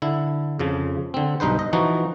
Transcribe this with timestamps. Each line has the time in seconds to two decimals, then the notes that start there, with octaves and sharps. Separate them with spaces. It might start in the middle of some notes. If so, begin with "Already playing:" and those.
0.02 D3 E4
0.59 F2 C#3 F3
1.14 D3 C4
1.40 B1 G2 D#4 B4 C5
1.59 D#5
1.73 E3 F3 D#4 F#4